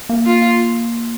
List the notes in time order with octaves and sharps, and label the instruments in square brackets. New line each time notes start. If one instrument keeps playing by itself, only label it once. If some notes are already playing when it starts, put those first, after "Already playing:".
[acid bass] A#3
[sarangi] F4